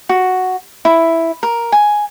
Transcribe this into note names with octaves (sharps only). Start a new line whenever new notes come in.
F#4
E4
A#4
G#5